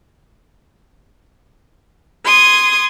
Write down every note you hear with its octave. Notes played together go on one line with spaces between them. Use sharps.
C6 D#6 G#6